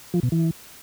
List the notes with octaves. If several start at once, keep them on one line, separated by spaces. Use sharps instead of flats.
F3
B2
E3